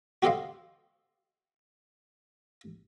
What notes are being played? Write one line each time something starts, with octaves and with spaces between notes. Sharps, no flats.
F#4 G4 A4 C5 D#5 F5